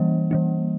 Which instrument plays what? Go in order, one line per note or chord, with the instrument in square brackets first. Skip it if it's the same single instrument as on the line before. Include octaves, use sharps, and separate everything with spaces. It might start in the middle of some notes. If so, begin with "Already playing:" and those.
Already playing: [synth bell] E3 G3 A#3
E3 G3 A#3